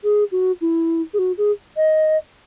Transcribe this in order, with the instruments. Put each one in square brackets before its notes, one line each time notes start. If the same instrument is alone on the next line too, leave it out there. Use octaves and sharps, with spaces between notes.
[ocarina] G#4
F#4
E4
G#4
F#4
G#4
D#5